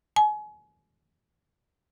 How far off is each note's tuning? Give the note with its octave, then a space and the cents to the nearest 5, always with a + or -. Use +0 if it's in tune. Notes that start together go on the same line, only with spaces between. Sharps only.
G#5 +30